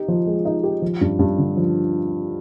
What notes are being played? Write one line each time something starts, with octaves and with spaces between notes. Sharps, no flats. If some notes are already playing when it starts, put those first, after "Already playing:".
Already playing: D#4 G4
F3
G#3
D#4
G4
F3
G2
G2
D3
F3